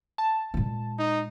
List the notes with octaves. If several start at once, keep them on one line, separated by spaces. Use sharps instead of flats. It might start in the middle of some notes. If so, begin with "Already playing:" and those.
A5
A#2 G#3
D#4